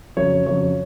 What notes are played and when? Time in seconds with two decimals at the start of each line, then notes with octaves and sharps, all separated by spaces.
0.17 F2 C#3 F#3 C#5
0.46 F2 C#3 F#3 C#5